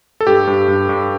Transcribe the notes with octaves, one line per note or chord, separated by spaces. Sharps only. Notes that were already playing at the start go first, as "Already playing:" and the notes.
A4
G2 G4
G2
G2
G2